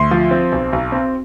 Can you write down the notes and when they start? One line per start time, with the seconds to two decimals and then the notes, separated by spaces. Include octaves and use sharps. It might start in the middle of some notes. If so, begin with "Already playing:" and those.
Already playing: D2 C6
0.11 F3
0.31 C4
0.52 B1
0.73 B1
0.92 C4